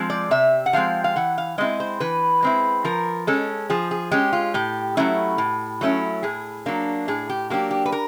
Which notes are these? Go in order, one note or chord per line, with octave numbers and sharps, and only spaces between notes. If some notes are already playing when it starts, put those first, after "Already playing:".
Already playing: F3 G#3 C4
D5
C3 E5
F#5
F3 G#3 C4 F5
F5
E3 F#5
F5
G#3 C4 E4 D#5
C5
E3 B4
G#3 C4 E4
F3 A#4
G#3 C#4 A4
F3 G#4
G#4
G#3 C#4 G4
F4
A2 G4
F#3 A3 C#4 E4
A2
F#3 A3 C#4 E4
A2 G#4
F#3 A#3 D4
A2 G#4
G4
F#3 A#3 D4 G4
G4
B4
A#4